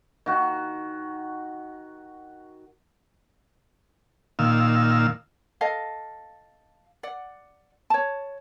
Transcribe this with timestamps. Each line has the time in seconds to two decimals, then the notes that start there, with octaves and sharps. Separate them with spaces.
0.26 D#3 F#4
4.39 A#2 D#3 F5 E6
5.61 A4 D#5 F5
7.03 D5 F#5
7.90 C#5 A5